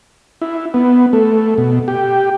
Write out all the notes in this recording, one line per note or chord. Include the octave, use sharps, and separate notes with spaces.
E4
B3
A3
B2
G4